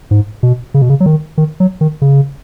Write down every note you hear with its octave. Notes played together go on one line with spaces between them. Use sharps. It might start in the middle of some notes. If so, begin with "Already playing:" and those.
G#2
B2
C#3
B2
C#3
F#3
D#3
D#3
F#3
D#3
C#3